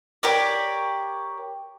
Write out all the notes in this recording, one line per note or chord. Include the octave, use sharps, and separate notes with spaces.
G4 A#4 C#5 D5